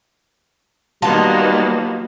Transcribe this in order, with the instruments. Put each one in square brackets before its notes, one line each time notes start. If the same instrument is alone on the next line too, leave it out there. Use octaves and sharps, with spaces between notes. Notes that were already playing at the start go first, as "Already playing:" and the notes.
[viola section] D#3 A#3 B3 [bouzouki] F#3 F4 [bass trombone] G3 [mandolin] A5 C6